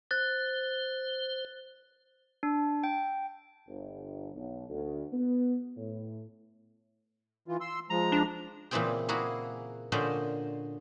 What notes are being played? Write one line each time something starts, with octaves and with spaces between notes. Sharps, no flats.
C5 F#6 A6
D4
G5
G1
B1
D2
B3
A2
E3 F4
C6 E6
F3 G#3 A#5
D4
A#2 C#3 E3 C4 G#4 G5
A#3 E4 F#4 G#4
A#2 D3 C#4 C5 D#5 G5